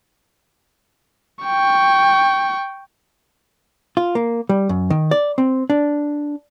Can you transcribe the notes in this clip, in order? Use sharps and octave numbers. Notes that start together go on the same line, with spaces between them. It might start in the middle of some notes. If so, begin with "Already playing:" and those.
G5 C#6
F4
A#3
G3
F#2
D#3
D5
C4
D4